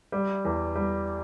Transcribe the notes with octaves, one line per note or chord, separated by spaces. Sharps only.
G3
E2
G3